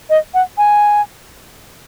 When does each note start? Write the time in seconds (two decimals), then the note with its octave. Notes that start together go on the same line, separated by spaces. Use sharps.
0.10 D#5
0.34 F#5
0.58 G#5